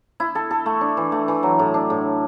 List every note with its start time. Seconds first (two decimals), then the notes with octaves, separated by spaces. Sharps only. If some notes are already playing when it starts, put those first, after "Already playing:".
0.20 E4
0.35 A4
0.51 A4
0.66 A3
0.81 D4
0.97 E3
1.12 A3
1.28 E3
1.43 F#3
1.59 A2
1.74 D4
1.90 A2